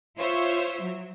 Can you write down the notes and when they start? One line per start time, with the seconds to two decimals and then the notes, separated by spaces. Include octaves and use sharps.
0.18 F4 C5 C#5 E5
0.81 F#3